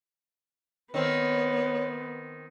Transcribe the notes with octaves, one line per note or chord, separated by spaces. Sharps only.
D#3 B3 C4 C#5